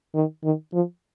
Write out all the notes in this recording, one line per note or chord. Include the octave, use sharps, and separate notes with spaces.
D#3
D#3
F3